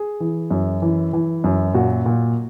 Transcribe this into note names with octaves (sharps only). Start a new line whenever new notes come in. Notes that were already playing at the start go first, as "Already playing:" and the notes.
Already playing: G#4
E3
F#2
E3
E3
F#2
A#2 F#4
A#2